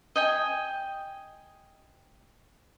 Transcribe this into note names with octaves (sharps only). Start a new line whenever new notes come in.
D#5 G5 G#5